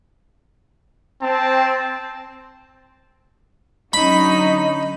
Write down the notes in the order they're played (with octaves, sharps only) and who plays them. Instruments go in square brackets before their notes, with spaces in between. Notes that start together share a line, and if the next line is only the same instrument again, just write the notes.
[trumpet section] C4 [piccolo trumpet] A5
[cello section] D3 F#3 C#4 [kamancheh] D#4 [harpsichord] B5